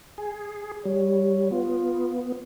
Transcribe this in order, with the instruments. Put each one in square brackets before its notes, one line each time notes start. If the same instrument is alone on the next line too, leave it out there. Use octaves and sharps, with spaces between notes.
[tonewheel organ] G#4
[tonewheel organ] G3 [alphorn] C#5
[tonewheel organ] B3 [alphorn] F4